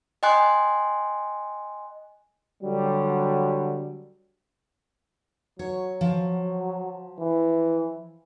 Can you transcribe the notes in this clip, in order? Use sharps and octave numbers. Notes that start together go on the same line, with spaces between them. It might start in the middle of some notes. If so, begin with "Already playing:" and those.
D#5 G5 G#5 C6 F#6
D3 F#3 G3
F#3 C#5
F3
E3